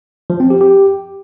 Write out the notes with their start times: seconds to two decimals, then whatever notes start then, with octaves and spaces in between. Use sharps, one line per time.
0.30 F3
0.40 C4
0.50 G4
0.61 G4